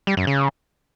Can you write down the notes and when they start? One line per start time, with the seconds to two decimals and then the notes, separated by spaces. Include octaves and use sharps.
0.07 G3
0.17 F#2
0.27 C#3